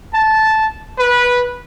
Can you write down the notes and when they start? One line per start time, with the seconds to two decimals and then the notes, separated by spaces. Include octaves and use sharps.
0.14 A5
0.99 B4